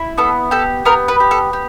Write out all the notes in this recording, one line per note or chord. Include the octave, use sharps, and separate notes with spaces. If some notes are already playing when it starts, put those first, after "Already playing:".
Already playing: E4
B3 A4
G4 A4
B3 A#4
B4
G4
A4
G4